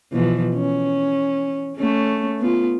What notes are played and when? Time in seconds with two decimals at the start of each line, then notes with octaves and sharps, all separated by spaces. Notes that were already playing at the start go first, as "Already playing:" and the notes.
0.12 B2 E3 F3
0.54 C#4
1.76 A3 C#4
2.39 B3 F4